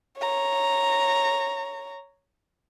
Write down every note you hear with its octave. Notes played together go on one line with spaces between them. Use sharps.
C#5 A#5